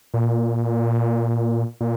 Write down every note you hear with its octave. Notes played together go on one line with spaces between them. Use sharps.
A#2
A#2